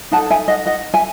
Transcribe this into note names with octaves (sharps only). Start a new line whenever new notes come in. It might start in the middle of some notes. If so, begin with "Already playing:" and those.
D#4 A4 F#5 A5
E5 G#5
D#5 F#5
D#5 F#5
E5 G#5